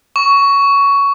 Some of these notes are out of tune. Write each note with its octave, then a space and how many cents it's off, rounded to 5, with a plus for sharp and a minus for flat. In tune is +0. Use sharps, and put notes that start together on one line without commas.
C#6 +15